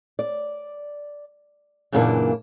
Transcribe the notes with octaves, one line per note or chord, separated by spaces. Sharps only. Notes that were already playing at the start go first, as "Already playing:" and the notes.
D5
F#2 A#2 C#3 E3 A#3 D4